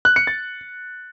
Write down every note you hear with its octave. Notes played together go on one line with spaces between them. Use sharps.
F#6
C#7
A6